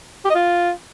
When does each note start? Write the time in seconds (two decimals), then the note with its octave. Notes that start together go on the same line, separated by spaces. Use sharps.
0.25 G4
0.30 D#5
0.35 F4